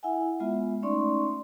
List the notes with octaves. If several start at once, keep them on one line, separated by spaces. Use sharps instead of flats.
E4 E5 F#5 G#5
G#3 B3 F4 E5
A3 C#4 D#4 D5 C6 C#6